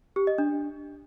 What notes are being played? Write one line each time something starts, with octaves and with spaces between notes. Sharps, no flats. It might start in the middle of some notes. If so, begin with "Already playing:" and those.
G4
D#5
D4